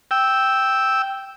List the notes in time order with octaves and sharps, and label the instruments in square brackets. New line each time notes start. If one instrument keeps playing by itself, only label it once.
[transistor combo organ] G5 E6